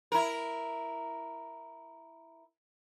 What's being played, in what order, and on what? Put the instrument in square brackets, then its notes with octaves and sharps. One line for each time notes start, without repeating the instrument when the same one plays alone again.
[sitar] E4 A#4